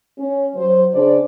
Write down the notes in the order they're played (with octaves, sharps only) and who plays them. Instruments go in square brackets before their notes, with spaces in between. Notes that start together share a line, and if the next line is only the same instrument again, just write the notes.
[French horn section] C#4
F#3 C5
C#3 D4 C5 D5